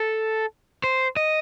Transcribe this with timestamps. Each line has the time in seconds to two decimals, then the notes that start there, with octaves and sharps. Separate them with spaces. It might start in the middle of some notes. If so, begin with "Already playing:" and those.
Already playing: A4
0.84 C5
1.16 D#5